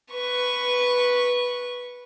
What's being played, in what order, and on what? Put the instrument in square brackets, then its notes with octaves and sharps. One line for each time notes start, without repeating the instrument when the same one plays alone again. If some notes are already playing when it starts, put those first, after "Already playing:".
[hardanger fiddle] B4 C#6